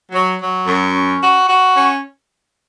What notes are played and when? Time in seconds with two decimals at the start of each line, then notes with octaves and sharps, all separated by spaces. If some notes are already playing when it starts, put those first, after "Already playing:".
0.11 F#3
0.38 F#3
0.66 F#2
0.94 C#4
1.20 F#4
1.48 F#4
1.75 C#4